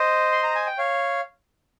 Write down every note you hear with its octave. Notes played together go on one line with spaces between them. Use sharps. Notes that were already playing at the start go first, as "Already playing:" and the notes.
Already playing: C5 D#5
C6
A#5
G#5
G5
C#5 F5